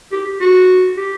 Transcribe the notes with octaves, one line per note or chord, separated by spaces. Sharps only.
G4
G4
F#4
G4